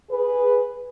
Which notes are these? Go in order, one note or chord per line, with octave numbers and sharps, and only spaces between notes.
G#4 B4